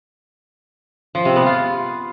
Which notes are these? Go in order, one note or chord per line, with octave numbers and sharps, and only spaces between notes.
F3
C3
B3
F4